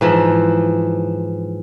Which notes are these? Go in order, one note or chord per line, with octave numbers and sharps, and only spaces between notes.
G#2 E3 F3